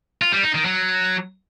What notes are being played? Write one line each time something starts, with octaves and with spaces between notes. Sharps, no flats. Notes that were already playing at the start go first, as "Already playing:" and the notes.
F4
G3
D#4
D#3
F#3